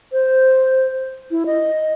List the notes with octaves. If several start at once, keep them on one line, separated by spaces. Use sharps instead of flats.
C5
E4
D#5